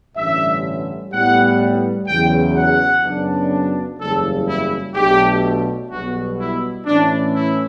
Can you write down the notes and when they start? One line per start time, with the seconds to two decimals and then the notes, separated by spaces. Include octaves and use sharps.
0.16 A1 G2 D3 G3 C#4 E5
1.12 A2 G3 B3 F#5
2.07 E2 C#3 F#3 G5
2.55 F#5
3.03 F#2 C#3 F#3 B3 D4
3.98 F#1 E2 C#3 G3 A4
4.46 E4
4.94 B1 B2 A3 D4 G4
5.90 B1 B2 G3 B3 F#4
6.38 E4
6.86 A2 E3 A3 C#4 D4
7.34 E4